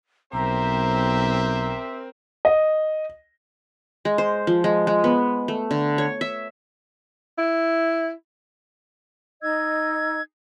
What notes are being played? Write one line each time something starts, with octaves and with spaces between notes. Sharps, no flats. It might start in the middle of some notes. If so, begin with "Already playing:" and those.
B1 C4 G4 A#4 C5 E5 A#5
D#5
G#3
C5
F3
G#3
G#3
B3
A3
D3
C#5
E5
E4
D#4 D#5 E6 G#6